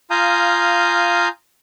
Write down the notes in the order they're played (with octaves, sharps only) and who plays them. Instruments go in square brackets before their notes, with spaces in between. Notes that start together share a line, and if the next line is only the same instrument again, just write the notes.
[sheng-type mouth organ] F4 F5 G#5 A#5 D#6 G6